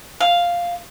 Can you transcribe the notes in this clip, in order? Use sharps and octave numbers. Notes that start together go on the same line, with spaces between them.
F5